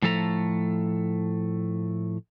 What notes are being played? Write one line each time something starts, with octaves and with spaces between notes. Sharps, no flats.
A2 F3 A3 A4 A5 A#5